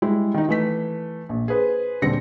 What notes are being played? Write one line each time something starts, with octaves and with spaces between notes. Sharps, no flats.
G3 G#3 E4
D#3 D#4
E3 A3 B6
A#1
G#4 B4 C5
D#1 D3 G3 C4 A#6 C#7